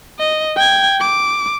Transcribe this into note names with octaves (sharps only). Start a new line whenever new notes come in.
D#5
G5 G#6
D6